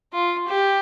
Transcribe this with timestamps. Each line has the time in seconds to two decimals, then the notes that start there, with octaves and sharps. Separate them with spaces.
0.13 F4
0.48 G4